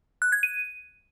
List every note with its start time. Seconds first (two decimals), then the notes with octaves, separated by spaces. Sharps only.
0.22 F#6
0.32 G#6
0.43 D#7